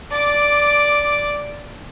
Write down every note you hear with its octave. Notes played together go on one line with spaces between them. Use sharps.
D5 D6